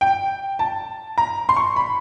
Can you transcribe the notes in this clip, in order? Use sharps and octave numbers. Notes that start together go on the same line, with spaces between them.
G5
A5
A#5
C6
C#6
B5